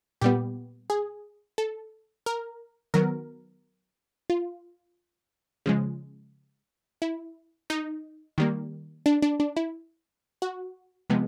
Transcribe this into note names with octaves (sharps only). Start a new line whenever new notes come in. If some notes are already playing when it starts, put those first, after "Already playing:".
A#2 G3 B3 G4
G#4
A4
A#4
D#3 F#3 B3 A#4
F4
C#3 F3 G#3
E4
D#4
D#3 G3 A#3
D4
D4
D4
E4
F#4
C3 F3 G#3 B3